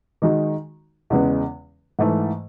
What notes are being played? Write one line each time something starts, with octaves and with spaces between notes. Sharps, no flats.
D#3 G#3 D#4 F#4
E2 C#3 G#3 B3
G#2 E3 A3